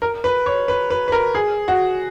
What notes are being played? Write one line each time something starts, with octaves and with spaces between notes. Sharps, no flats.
A#4
B4
C#5
B4
B4
B4
A#4
G#4
F#4